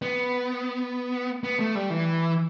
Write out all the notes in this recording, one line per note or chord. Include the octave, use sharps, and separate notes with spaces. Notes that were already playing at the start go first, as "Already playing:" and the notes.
B3
B3
A3
G3
E3